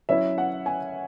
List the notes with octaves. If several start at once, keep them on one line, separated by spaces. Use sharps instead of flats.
F#3 C#4 E4 E5
F#5
G#5